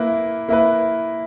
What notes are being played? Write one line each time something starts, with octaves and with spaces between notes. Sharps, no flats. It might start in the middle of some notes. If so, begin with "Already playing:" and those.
Already playing: A#3 E4 B4
A#3 E4 B4